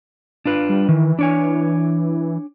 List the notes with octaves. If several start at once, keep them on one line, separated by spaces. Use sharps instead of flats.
D4 F4 B4
G3
D#3 E3
D4 C#5 G#5